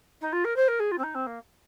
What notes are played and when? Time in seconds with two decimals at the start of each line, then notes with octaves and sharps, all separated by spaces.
0.21 D#4
0.32 F4
0.44 A#4
0.56 C5
0.68 A#4
0.79 G#4
0.91 F4
0.98 C4
1.03 D#4
1.14 C4
1.26 A#3